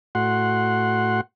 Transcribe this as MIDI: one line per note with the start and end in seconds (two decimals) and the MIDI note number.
0.15 1.21 45
0.15 1.21 66
0.15 1.21 78
0.15 1.21 84